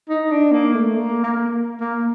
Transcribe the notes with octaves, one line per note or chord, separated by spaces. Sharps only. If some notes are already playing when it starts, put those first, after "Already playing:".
D#4
D4
A#3
A3
A#3
A#3
A#3